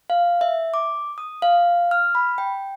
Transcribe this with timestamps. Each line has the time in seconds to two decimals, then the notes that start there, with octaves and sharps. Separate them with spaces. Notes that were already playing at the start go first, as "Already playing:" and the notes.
0.10 F5
0.41 E5
0.74 D6
1.18 D#6
1.42 F5
1.91 F6
2.15 B5
2.38 G5